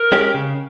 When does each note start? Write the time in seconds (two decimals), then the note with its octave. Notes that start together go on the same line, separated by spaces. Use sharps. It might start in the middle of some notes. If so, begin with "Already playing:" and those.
Already playing: A#4
0.12 G#3 C#4 G4
0.35 C#3